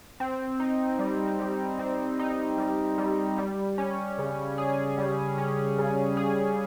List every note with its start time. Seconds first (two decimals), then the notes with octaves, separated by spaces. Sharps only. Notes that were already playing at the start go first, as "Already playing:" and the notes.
0.20 C4
0.60 D#4
0.99 G3
1.40 G3
1.79 C4
2.19 D#4
2.58 G3
2.98 G3
3.38 G3
3.78 C#4
4.18 C#3
4.58 G#4
4.98 G3
5.38 C#4
5.78 C#3
6.17 G#4